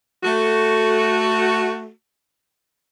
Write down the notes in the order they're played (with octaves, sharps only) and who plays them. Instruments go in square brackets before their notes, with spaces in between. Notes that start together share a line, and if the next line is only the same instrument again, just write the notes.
[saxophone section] A3 F#4